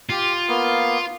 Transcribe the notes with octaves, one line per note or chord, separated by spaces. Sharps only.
F4 G4
A#3 B3